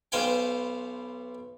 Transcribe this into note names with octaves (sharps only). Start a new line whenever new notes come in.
B1 B2 C5 F5 G5 G#5